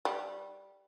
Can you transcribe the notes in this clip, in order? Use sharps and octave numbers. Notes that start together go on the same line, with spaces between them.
G3